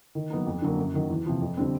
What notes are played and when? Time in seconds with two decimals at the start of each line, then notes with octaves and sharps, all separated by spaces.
0.15 D#3
0.30 F#3 B3 D#4
0.46 F2
0.62 D3 F#3 A#3
0.78 F#2
0.94 D#3 F#3
1.10 E2
1.26 C3 F3
1.41 F2
1.57 D3 G3 C4